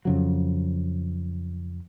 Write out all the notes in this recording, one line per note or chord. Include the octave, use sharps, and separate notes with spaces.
F2 C#3 F#3